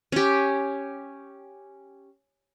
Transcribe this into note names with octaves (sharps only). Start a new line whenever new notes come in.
C#4 G4